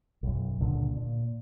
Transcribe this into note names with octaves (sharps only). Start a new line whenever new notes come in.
B1 F#2
C#2 A#2 D3
A#2